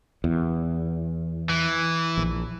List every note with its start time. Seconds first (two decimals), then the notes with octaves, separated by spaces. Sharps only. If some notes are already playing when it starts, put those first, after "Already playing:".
0.24 E2
1.49 E3
2.18 A#1